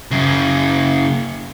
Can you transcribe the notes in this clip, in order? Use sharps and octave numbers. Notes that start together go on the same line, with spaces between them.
F#2 C#3